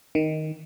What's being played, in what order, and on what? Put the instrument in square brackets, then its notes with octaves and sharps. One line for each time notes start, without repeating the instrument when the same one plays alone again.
[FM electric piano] D#3